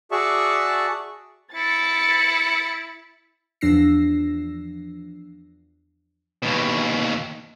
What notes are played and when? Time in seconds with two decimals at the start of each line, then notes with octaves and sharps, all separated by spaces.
0.11 F#4 G#4 D5 E5 A5 C#6
1.55 E4 A6 C#7
3.61 E2 F3 D4 E6 A#6 C7
6.42 D#2 B2